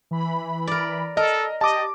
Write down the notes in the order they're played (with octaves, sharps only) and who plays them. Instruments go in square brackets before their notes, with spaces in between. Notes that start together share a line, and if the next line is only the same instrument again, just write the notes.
[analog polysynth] E3 B5
[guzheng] A#4 D5
[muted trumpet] A4 [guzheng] A#4 [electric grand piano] D#5
[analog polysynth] G4 [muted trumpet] D#5 [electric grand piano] A5 D6